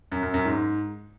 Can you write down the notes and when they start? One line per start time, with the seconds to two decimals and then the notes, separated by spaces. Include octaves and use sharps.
0.12 F#2
0.23 F#2
0.34 F#2
0.45 G#2